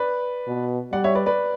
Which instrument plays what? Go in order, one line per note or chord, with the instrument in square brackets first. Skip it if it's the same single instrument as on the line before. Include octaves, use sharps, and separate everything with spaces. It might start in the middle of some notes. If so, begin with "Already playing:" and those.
Already playing: [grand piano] B4 D5
[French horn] B2
[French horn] G3 [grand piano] D5 F#5
[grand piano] C#5 E5
B4 D5
B4 D5